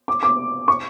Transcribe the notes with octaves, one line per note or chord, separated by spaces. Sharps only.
D6
D6
C#6